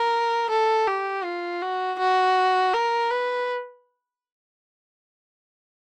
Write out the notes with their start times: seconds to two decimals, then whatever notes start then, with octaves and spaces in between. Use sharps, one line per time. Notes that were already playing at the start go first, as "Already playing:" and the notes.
Already playing: A#4
0.50 A4
0.87 G4
1.24 F4
1.62 F#4
1.99 F#4
2.73 A#4
3.11 B4